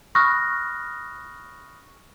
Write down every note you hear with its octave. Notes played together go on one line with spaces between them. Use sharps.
B5 C#6 D#6 F6 F#6 A#6